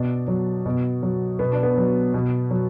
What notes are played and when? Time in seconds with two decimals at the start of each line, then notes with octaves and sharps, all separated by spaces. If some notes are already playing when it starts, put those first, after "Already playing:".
Already playing: B2 D4
0.28 F#3
0.66 B2
1.03 F#3
1.39 B2 B3
1.52 D4
1.63 B3
1.78 F#3
2.14 B2
2.51 F#3